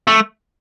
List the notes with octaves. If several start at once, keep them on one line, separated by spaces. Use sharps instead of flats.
A3